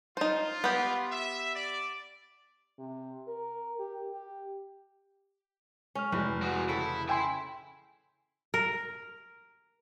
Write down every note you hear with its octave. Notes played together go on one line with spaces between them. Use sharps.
D#4 F4 C5
B3 G4
E5
D5
C3
A#4
G4
G4
G#3 C#4 F6
F1 E3
F#4 G#4
C#3 E4 A4
E4 E5 G5 G#5 C6
A#4